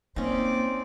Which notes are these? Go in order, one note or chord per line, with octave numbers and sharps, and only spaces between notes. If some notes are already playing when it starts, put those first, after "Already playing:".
A#3 C4 C#4 D#4 D5